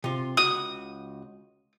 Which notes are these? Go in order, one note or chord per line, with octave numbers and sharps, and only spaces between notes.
C3 F4
C#2 F#4 D#6